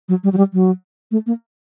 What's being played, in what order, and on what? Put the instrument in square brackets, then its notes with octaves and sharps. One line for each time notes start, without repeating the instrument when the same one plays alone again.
[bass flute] F#3
G3
F#3
G3
F#3
A3
A#3